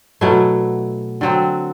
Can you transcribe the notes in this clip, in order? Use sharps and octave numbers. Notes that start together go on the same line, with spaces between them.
B2 F#3 A3 E4
D3 F#3 C4